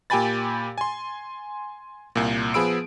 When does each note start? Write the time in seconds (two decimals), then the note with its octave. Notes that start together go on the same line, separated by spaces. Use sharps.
0.10 A#2 G4 G5 G#5 B5 A6
0.78 G#5 C6
2.16 C2 A#2
2.54 F3 B3 G#4 B5 E6 D7